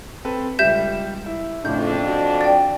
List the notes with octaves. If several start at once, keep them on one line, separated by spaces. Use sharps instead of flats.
C4 A4 B4
C#2 G3 E5 G6 E7
E4
F2 A2 C#3 D4 G6
F#4
D5 G5